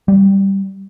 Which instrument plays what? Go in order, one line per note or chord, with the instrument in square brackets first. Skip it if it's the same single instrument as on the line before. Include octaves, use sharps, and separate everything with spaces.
[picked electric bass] G3